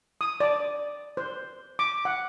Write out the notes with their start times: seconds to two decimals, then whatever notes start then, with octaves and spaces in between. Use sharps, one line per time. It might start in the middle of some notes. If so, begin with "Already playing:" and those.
0.21 D#6
0.40 D5
1.17 C5
1.79 D6
2.05 F#5